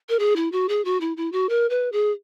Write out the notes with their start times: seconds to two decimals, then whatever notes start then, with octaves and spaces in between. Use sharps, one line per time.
0.09 A#4
0.19 G#4
0.36 E4
0.52 F#4
0.69 G#4
0.85 F#4
1.01 E4
1.17 E4
1.32 F#4
1.49 A#4
1.70 B4
1.92 G#4